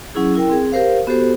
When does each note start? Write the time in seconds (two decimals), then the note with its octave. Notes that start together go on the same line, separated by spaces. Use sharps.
0.15 F#3 C#4 E4 G#4
0.35 E4 A#4 G5
0.50 C4 G#4
0.72 G4 A#4 C5 F5
1.07 B3 F#4 G4 A4 C5